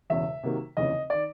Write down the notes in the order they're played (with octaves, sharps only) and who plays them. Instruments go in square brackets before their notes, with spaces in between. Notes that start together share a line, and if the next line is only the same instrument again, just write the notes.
[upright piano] E1 E2 C#3 [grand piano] E5
[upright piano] C3 D#3 F#3 A#3
[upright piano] F1 D#2 C#3 E3 [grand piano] D#5
[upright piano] D#3 [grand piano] D5